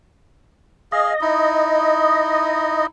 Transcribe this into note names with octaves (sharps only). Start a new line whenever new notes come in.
G#4 D#5 F5
D#4 E4